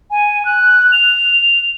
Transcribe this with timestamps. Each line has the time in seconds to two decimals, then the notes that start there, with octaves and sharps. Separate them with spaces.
0.11 G#5
0.45 F#6
0.92 F7